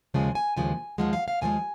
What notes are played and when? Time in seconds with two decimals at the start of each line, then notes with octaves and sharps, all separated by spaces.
0.14 D#2 C#3 F3 G#3 G#5
0.35 G#5
0.57 D#2 C#3 F3 G#3 G#5
0.98 D#2 C#3 F3 G#3 F#5
1.13 F5
1.28 F5
1.41 D#2 C#3 F3 G#3 G#5